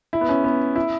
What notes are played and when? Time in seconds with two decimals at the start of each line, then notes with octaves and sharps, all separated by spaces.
0.13 E4
0.21 B3
0.29 C#4
0.44 B3
0.76 E4